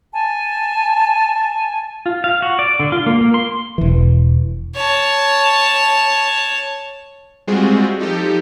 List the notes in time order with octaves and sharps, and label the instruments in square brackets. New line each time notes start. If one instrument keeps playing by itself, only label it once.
[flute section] G#5 A5
[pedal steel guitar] F4
F5
F#4
D5
D3
F4
A#3
A#3
C6
[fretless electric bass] E1 E3
[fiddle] C#5 A5
[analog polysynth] G3 G#3 C4 F4 F#4 G#4
F3 D#4 G4 A4